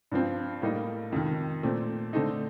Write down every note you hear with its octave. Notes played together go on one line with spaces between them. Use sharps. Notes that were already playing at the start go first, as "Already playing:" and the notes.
G2 F3 C4
A2 G3 A#3 D#4
F2 C3 D#3
A#2 A3 C4
D3 A3 C4 D#4